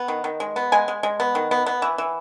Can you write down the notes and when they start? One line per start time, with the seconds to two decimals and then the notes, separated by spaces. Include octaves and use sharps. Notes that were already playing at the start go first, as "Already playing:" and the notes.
Already playing: B3
0.08 D#3
0.24 D#3
0.40 G#3
0.56 B3
0.72 G#3 G#5
0.88 G#3
1.03 G#3
1.20 B3
1.35 D#3
1.51 B3
1.66 B3
1.82 E3
1.98 E3